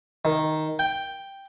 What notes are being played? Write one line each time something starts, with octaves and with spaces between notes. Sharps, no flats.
D#3
G5